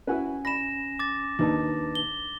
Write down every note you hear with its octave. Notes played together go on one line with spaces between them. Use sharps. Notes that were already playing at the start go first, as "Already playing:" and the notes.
C#4 E4 F#4 B4 G#5
B5 A#6 E7
D6 A6
D#2 D4 D#4 B4 A5
G7